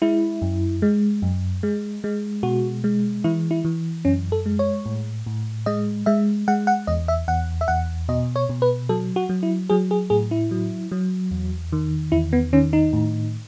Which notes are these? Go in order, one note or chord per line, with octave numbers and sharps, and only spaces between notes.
G#3 E4
F#2
G#3
F#2
G#3
G#3
B2 F#4
G#3
E3 E4
E4
E3
F#2 C#4
A4
G#3
C#5
A2
A2
G#3 D#5
G#3 E5
G#3 F#5
F#5
E2 D#5
E5
E2 F#5
E5
E2 F#5
B2 D#5
C#5
B2
B4
F#3 A4
F#4
F#3
E4
F#3 G#4
G#4
A2 G#4
E4
F#3
F#3
E2
D#3
E2 E4
B3
D#3 C#4
D#4
A2